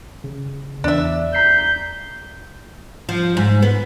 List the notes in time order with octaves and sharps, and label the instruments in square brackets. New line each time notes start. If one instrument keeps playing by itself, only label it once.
[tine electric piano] C#3
[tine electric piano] E2 [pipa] D4 E5
[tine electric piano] A#5 B6 C7 [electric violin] G6
[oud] F3
G#2
B3